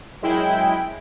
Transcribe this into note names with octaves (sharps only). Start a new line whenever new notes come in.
F#2 G#3 E4 G5